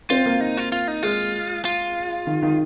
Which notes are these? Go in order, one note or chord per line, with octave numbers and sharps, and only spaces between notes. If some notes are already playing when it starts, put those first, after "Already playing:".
C4 F4
A#3
D#4
F4
F4
D#4
G#3 F4
F4
D#3
D#3